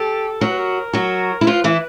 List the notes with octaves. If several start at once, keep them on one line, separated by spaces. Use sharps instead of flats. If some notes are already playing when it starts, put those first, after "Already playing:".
Already playing: G4 A4
F#3 F#4 A#4
B4
A#4
F#3 F#4
E4
F3 F4 B4
E3 E4